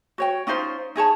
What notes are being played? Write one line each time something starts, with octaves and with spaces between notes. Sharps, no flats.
F#4 C#5 G5
C#4 D#4 F4 C5
D#4 G#4 C#5 A5